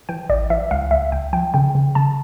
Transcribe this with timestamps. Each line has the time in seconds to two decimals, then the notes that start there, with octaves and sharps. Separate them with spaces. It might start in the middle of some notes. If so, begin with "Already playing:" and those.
0.09 E3 G5
0.29 A1 D5
0.50 E3 E5
0.71 C#2 F5
0.91 C#2 E5
1.12 C#2 G5
1.33 F3 G5
1.54 C#3 G5
1.75 C#3
1.95 C#3 A5